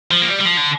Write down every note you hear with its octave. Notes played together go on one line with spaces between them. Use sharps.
F3
A#3
G3
G3
F3
D3